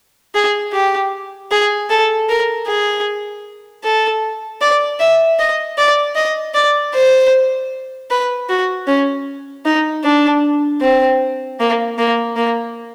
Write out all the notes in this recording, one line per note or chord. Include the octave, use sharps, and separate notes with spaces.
G#4
G4
G#4
A4
A#4
G#4
A4
D5
E5
D#5
D5
D#5
D5
C5
B4
F#4
C#4
D#4
D4
C4
A#3
A#3
A#3